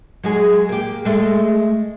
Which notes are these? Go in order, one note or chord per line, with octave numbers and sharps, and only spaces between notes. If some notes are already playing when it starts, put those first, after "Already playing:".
F#3 G#3 G#4
A#3 G4
G#3 A3